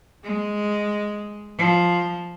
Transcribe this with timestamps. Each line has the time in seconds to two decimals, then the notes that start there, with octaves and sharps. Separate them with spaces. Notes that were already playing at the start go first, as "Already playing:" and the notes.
0.23 G#3
1.58 F3